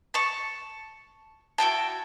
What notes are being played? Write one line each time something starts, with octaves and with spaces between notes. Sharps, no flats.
A5 C#6
E4 F#4 G5 A5